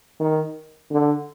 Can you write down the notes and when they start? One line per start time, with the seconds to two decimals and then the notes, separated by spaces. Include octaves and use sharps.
0.20 D#3
0.91 D3